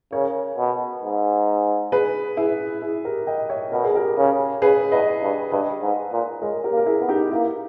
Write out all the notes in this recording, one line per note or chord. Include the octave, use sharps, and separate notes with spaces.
C#3 A#4 C#5
B2
G#2
G#4 B4
E4 G#4
E4 G#4
G4 A#4
D#5 G5
C#5 E5
B2 A#4
G#4
G4 A#4
C#3
C#3 G#4 B4
E2 B4 D#5
G2
G2 B4 D#5
G#2
A#2
G#3 A#4 C#5
G4 A#4
A#3
A#4
E4 G#4
B3
D#4 G4
A#3 E4